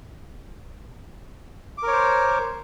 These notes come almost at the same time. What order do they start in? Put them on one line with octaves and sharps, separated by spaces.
D6 A#4 C#5 C5